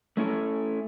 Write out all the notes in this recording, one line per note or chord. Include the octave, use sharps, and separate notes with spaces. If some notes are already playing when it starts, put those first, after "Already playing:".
A3 C#4 E4 A4